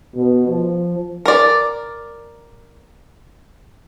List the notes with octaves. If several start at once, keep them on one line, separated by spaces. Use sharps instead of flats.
B2
F3
A#4 D5